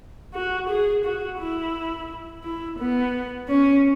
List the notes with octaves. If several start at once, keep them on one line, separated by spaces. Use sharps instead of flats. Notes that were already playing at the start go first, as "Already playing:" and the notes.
F#4
G#4
F#4
E4
E4
B3
C#4